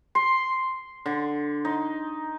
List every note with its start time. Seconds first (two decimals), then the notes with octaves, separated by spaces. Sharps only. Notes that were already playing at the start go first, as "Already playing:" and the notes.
0.15 C6
1.06 D3
1.65 D#4